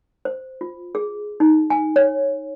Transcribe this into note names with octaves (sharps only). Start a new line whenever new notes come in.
C5
F4
G#4
D#4
G#5
C#5